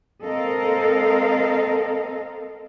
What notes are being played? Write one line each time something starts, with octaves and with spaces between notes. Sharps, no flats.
G#3 C4 A4 A#4 D#5 F5